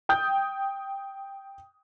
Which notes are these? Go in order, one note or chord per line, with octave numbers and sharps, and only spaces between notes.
G5 D#6 G6